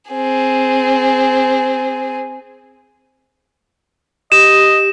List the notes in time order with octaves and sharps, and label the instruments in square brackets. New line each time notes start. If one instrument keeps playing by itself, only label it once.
[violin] C4 G#4
[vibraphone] G4 [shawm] D#5 [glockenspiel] E7